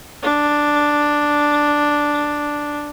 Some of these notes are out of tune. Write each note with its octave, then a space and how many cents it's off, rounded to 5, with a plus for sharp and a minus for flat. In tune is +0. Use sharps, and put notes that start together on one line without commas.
D4 +0